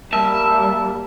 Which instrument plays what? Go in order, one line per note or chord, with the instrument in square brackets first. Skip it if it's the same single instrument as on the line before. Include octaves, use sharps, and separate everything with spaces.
[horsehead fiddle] G3 [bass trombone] A#3 [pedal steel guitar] E5 [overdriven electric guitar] A5